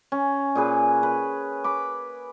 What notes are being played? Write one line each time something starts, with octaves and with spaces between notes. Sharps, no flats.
C#4
A#2 G#4 B4
B4
B5 D6